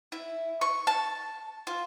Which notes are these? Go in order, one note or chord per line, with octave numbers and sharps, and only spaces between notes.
E4
C#6
A5
F4